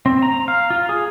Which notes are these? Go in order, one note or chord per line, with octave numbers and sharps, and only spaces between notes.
C4
A#5
F5
F4
G#4